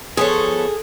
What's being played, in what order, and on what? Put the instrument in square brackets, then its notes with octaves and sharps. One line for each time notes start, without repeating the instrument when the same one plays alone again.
[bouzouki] F3 B3 C#5 [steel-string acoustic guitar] G#4 [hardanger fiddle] A4